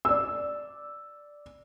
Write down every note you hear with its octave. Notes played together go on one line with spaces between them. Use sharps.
D5 E6